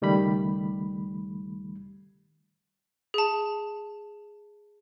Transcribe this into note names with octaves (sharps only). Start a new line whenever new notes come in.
C#2 D#3 G3 A3 B5
G#4 A5